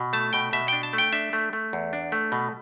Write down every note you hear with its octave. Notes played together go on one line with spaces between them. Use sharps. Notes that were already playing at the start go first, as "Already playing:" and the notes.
Already playing: B2
A3 A5
B2 G5
B2 E5
D4 G5
A5
A3
G5
D4 E5
A3
A3
E2
D4
A3
B2